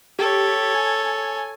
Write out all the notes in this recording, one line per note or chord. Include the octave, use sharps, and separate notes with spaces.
G4 A4 C#5
G#5